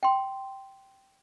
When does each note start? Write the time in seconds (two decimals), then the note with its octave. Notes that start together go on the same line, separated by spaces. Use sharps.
0.03 G5 C6